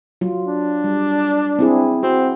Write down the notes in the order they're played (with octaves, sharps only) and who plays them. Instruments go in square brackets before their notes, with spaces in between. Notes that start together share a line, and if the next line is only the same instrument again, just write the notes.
[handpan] F#3 F4
[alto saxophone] D4
[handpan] G3
C4 E4 G#4
[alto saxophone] C4 [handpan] F#4